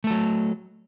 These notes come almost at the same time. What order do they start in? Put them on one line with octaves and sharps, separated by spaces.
A3 A4 F#3